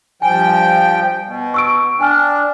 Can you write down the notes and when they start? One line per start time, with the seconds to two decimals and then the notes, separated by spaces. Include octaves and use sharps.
0.22 G2 F3 G5 G#5
1.26 B2
1.54 C#6 E6 D7
1.99 D4 G5 G#5 F6